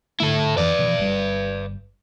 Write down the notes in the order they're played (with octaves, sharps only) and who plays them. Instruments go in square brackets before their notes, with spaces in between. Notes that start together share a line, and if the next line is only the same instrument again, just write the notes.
[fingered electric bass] G#2 D3 A3 [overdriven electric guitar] E4 A4
[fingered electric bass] F2 E3 [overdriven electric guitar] B4 D5
[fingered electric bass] B2 E3 F3
G1 G3